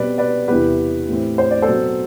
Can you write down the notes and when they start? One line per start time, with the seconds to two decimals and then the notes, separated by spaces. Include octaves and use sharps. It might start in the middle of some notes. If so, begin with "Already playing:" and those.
Already playing: B2 G3 C4 B4 D5
0.18 B4 D5
0.48 E2 C3 E3 G3 B3 G4 B4
1.08 A2 E3 A3 C4
1.38 C5
1.51 D5
1.62 A4 C5
1.69 B2 F#3 C4